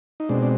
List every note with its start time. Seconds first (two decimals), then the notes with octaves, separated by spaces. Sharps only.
0.20 D#4
0.29 B2 G#3 C4 D4
0.42 D4